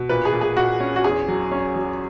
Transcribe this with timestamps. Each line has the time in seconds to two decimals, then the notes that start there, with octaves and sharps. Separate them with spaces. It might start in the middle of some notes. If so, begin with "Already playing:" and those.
Already playing: B2
0.09 A#2 B4
0.25 G#4
0.33 A#2
0.41 G#4
0.57 A#2 F#4
0.80 C#4
0.96 F#4
1.04 E2 G#4
1.28 F#3
1.51 C#4
1.76 F#3